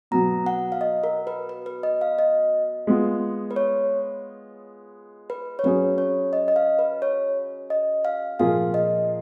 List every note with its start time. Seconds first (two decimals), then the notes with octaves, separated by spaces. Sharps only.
0.11 B2 F#3 B3 A#5
0.46 F#5
0.72 F5
0.81 D#5
1.04 A#4
1.27 B4
1.49 B4
1.66 B4
1.83 D#5
2.01 F5
2.19 D#5
2.87 G#3 B3 F4
3.51 B4
3.56 C#5
5.30 B4
5.59 C#5
5.63 F#3 C#4 G#4 B4
5.98 C#5
6.33 D#5
6.48 D#5
6.56 F5
6.79 B4
7.02 C#5
7.70 D#5
8.05 F5
8.40 A#2 F3 A#3 F4 G#4 F5
8.74 D#5